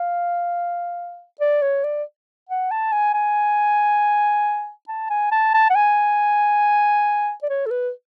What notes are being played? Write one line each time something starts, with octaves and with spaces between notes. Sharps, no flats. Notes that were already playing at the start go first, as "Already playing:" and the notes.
Already playing: F5
D5
C#5
D5
F#5
A5
G#5
G#5
A5
G#5
A5
A5
F#5
G#5
D5
C#5
A4
B4